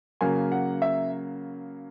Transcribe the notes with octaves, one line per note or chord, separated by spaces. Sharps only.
C#3 F#3 A#3 G#5
F#5
E5